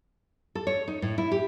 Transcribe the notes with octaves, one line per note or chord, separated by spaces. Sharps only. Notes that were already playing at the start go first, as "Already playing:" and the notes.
A4
C#5
D#4
A2
E4
G4